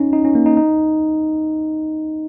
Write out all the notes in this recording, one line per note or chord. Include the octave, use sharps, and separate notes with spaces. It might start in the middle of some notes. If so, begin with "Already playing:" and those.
Already playing: C#4 D#4
D#4
C#4
A#3
D#4
D#4